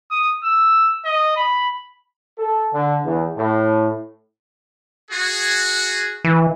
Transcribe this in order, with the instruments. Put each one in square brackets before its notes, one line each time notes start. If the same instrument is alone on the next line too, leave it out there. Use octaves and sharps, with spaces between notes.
[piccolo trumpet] D#6
E6
D#5
B5
[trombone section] A4
D3
E2
A2
[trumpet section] F#4 G#4
[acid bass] E3